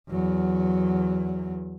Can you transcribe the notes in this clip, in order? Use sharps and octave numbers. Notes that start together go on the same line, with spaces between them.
E2 F#3